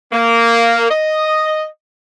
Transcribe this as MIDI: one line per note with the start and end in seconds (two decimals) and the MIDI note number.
0.13 0.87 58
0.90 1.66 75